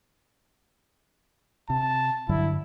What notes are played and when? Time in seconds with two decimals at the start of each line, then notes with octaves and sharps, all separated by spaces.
1.70 C3 A5
2.29 G2 D3 F#3 E4